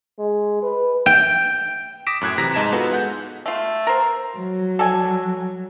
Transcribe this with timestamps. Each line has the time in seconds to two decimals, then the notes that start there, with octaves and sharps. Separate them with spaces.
0.19 G#3
0.62 B4
1.06 G5
2.07 D6 D#6 A#6 B6 D7 E7
2.21 F#2 A2 F#6 G#6
2.38 C3 E3 A#5 A#6 B6
2.54 G#2 D#5 A5 G#6 E7
2.72 B3 D#4 F4 F#4 A4 B4
2.92 G#3 F#5 G6
3.46 A3 F4
3.87 A#4 C5
4.35 F#3
4.79 A4 D5 G#5